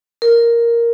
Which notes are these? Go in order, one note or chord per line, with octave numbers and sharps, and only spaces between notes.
A#4